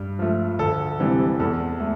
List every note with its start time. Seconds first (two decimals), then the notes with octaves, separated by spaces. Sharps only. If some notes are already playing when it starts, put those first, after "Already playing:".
Already playing: G2
0.19 F3 A3
0.59 D2 A4
1.00 C3 E3 G3
1.40 E2 A4
1.80 A3